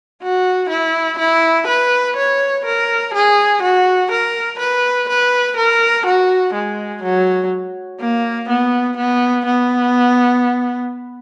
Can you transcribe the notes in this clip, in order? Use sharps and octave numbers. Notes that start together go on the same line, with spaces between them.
F#4
E4
E4
B4
C#5
A#4
G#4
F#4
A#4
B4
B4
A#4
F#4
G#3
F#3
A#3
B3
B3
B3